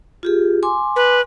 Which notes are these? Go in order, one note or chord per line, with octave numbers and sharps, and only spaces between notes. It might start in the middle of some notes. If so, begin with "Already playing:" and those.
F4 G4 G#4
G#5 C6 D6
B4